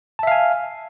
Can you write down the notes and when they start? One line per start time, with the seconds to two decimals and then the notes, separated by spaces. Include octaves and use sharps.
0.19 A5
0.23 E5
0.27 F5
0.32 G#5